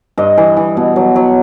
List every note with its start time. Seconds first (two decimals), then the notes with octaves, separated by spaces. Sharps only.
0.18 G2 D#5
0.38 E3
0.57 E3
0.77 B2
0.96 F#3
1.16 F#3